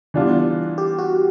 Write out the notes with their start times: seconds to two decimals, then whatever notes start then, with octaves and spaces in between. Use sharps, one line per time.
0.14 E3 G3 B3 D4 F4
0.78 G4
0.98 F#4